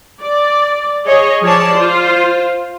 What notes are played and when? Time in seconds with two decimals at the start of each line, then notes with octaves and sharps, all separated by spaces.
0.22 D5
1.06 G#4 C#5 D#5
1.43 F3 G#4 C#5 D5 A5
1.74 F4 C5